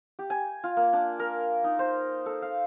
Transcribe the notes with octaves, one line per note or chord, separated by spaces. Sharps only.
G4
G#5
F4
A#3
D4
A#4
D#4
C5
A4
F5